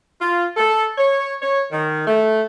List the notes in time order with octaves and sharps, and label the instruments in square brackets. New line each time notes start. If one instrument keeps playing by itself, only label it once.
[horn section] F4
A4
C#5
C#5
D#3
A3